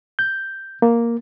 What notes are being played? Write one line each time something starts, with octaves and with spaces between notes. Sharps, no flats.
G6
A#3